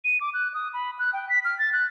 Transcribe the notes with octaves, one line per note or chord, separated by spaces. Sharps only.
D#7
D6
F#6
D#6
B5
F#6
G5
B6
F6
A6
F#6